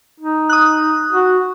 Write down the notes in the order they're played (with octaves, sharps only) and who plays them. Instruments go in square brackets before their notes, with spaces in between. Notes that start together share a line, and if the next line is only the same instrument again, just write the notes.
[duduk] D#4
[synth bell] D#6 F#6
[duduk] F#4